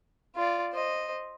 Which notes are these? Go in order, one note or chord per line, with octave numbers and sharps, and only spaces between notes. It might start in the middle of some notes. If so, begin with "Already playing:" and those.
F4 D5
C5 D#5